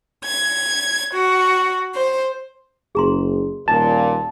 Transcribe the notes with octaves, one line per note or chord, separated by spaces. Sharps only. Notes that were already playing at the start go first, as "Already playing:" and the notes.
G#6
F#4
C5
F#1 G#4 A#5 C6
D#1 A#2 A5